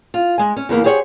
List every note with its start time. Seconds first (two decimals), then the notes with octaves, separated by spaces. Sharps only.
0.14 F4
0.38 G#3 G#5
0.56 C#4
0.69 E2 C#3 A#3 B3
0.84 G4 G#4 C5 C#5 D#5 F#5